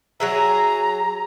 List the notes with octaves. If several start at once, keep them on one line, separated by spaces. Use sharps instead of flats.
F#3 G#4 E5 A#5